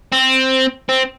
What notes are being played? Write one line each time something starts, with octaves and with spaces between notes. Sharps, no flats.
C4
C4